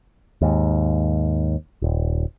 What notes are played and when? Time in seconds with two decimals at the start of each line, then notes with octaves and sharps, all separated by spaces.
0.41 D#2 G#2
1.82 D#1